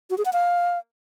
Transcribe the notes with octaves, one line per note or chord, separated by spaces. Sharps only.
F#4
G#4
F#5
F5